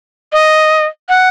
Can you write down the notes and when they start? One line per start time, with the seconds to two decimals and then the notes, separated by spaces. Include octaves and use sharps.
0.32 D#5
1.09 F#5